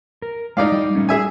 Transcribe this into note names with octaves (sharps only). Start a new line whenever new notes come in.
A#4
G#3 A3 D#4 E4 D5 F5
G3
G3 A3 C#4
G#4 E5 G#5